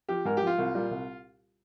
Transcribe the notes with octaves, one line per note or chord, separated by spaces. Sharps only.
F3 G4
G#2 A#4
F3 G4
F4
C2
A#2 G3
C2